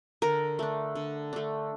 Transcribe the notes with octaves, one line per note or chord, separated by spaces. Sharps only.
D3 A#4
A3 D4
D3
A3 D4